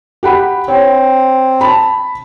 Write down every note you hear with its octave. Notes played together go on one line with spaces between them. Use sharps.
G4 F#5 B5
C4 C#5
A5 B5